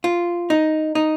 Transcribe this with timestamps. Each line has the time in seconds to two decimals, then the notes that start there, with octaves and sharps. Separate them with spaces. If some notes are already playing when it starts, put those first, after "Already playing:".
0.04 F4
0.50 D#4
0.95 D#4